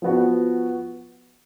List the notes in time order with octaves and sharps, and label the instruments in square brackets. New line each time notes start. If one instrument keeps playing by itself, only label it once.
[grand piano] F3 B3 F#4